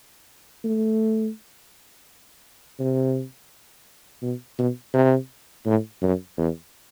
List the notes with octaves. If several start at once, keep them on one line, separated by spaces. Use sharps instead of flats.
A3
C3
B2
B2
C3
A2
F#2
E2